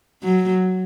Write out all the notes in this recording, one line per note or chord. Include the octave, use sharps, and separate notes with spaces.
F#3